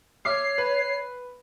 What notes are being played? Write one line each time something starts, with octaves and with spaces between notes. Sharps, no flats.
C#5 E5 D6 F6 C7
B4